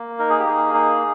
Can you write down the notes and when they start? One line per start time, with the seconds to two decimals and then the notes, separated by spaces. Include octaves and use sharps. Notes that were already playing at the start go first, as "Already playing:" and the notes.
Already playing: A#3
0.19 D#4 A#4
0.30 G#4
0.39 G4
0.47 A#3 G#4
0.74 D#4